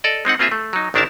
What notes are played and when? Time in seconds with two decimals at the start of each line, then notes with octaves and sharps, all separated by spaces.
0.04 A4 D5 D#5
0.25 G#3 C4 D#4 F#5
0.39 A#3 C4 F4 G#4 E5
0.52 A3
0.73 F#3 D#4
0.94 A1 D#3 D4 E4 A#4 A5